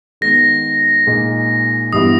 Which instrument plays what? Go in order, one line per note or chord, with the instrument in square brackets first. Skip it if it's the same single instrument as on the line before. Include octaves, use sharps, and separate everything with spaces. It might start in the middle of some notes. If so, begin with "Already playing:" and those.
[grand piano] D#3 G#3 B3 [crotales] A#6
[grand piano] A#2 G#3 D#4
[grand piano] G2 E3 G3 B3 E4 [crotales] D#6